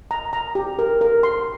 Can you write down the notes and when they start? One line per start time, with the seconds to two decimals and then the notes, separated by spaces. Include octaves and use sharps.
0.11 A#5
0.33 A#5
0.55 G4
0.79 A#4
1.01 A#4
1.23 C6